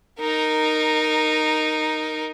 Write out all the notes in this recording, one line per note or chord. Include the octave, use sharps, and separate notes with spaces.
D#4 A#4